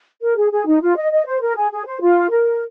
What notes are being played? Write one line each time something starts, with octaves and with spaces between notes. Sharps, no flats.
A#4
G#4
G#4
D#4
F4
D#5
D#5
C5
A#4
G#4
G#4
C5
F4
A#4